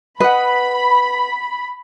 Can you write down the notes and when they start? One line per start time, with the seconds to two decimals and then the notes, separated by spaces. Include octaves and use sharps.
0.20 B4 D#5 F#5 B5